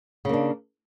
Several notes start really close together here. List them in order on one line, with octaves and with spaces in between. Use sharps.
C#3 A#3 D4